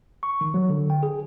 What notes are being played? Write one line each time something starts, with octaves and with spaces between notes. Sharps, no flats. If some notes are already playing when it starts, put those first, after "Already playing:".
C#6
D#3
F#3
D3
G5
G#4